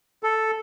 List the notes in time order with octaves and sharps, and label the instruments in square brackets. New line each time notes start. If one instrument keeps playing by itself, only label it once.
[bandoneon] A4